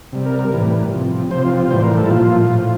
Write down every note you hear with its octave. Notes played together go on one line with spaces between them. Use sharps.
C3 G3
A#4
A#4
A2 E3 G3
C3 F3
C3 F3 C5
F4
F4
A2 E3 G3 C5
A#4
A4
E4
A#2 F3 F4
A2 F3